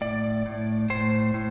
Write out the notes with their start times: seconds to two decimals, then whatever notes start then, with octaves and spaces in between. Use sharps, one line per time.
0.01 A2 D5
0.46 A2
0.90 A2 C5
1.34 A2